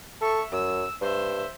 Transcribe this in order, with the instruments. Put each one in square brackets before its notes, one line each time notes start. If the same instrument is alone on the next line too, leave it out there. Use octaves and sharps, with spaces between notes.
[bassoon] A4 [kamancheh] E5 C#6
[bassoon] F#2 [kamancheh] E6
[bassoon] G2 [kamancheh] C5 E5